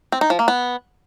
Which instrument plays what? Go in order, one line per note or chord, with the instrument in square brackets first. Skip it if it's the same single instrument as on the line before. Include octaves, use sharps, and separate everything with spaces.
[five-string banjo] C4
D#4
F3
A#3
B3